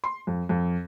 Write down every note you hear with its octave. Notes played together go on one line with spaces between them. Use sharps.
C6
F2
F2